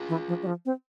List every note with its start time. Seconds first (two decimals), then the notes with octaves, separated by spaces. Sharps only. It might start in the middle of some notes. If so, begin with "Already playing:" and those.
Already playing: F4 G#4
0.09 E3
0.28 F3
0.42 G3
0.46 F3
0.66 C4